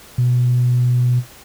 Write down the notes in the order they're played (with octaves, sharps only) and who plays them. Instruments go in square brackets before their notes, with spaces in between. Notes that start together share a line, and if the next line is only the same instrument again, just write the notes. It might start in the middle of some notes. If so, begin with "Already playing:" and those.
[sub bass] B2